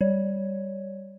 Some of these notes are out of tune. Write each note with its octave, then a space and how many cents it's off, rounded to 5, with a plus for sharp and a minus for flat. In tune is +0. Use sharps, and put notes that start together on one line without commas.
G3 +0 C#5 +0